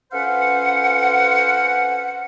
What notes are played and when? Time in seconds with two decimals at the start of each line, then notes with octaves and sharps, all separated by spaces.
0.12 F2 C#4 B4 C5 F5 F#5